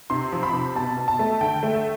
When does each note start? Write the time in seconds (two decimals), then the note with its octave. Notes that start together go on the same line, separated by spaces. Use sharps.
0.10 C3 C6
0.32 F3
0.43 B5
0.53 C3
0.75 B2 A5
0.97 B2
1.08 A5
1.19 A3
1.41 D3 G5
1.63 A3
1.74 E5